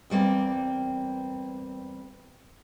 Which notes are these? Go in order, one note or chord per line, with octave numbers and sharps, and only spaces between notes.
E2 G3 A#3 C4